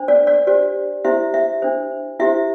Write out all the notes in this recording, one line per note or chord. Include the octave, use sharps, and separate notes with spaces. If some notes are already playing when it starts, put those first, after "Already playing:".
Already playing: D4 C5
D5
D5
D4 G4 C5 D5
E4 G4 C5 E5
E5
D4 C5
E4 G4 C5 E5